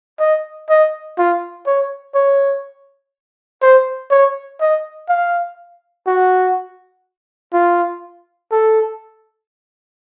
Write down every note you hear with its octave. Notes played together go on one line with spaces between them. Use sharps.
D#5
D#5
F4
C#5
C#5
C5
C#5
D#5
F5
F#4
F4
A4